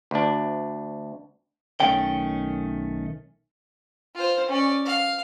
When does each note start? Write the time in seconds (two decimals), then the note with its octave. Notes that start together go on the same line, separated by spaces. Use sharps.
0.11 D2 D4
1.80 B1 D#3 A3 C#4 G5
4.15 F4 C5
4.49 C#4 D5
4.85 F5